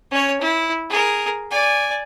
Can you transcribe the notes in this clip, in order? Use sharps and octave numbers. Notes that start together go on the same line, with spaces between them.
C#4 C#5
E4
G#4 A#4
D5 G#5